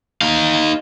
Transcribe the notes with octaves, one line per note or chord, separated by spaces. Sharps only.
D#4 F5